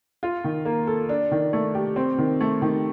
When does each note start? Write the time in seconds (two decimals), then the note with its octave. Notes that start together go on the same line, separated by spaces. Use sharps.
0.23 F4
0.44 D#3
0.65 A#3
0.87 A4
1.09 D4
1.32 D#3
1.53 A3
1.75 G4
1.96 C4
2.18 D#3
2.41 A3
2.62 D#3